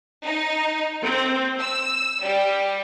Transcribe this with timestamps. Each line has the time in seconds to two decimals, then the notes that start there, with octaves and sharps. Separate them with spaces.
0.23 D#4
1.02 C4
1.59 E6
2.23 G3